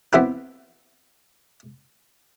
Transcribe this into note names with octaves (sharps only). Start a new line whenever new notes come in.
B3 C4 E4 G4 B4